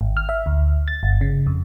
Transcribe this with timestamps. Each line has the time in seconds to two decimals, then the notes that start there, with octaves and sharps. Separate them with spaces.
0.01 G#1
0.17 F6
0.29 E5
0.46 D2
0.88 A6
1.03 G1
1.21 C#3
1.46 F2